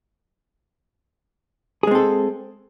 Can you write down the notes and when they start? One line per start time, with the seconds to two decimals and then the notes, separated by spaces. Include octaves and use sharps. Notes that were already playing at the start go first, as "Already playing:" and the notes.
1.83 G#4
1.87 G#3
1.91 C4
1.95 A4